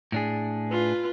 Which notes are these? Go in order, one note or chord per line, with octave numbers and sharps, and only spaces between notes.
A2 D4 G#4
F4 B4